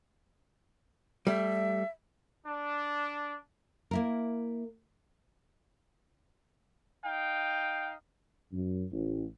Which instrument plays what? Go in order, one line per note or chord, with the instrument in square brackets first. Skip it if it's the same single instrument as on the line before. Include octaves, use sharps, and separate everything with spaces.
[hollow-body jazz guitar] G3 A3 [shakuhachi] E5
[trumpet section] D4
[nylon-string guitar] A#3 E4 A#4
[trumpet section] D#4 F5 G5
[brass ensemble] F#2
A1